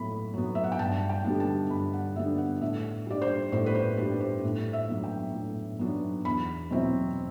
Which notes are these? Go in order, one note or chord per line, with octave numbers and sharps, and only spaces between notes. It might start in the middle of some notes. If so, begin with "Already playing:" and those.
Already playing: A2 F#3 B3 B5
F#3 B3
E5
F#5
G5
G2 A5
G5
D3 G3 B3 D4
A5
G2 B5
F#5
D3 G3 B3 D4 E5
F#5
A2 E5
G3 D4 D5
C5
A2 C5
B4
C5
G3 D4 B4
C5
A2
E5
F#3 B3 D4
G5
A2
F#3 B3 D4
E2 B5
B2 F#3 C4 E4